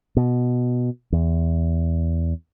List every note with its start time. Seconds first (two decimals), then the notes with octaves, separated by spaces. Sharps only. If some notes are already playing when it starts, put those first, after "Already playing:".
0.17 B2
1.12 E2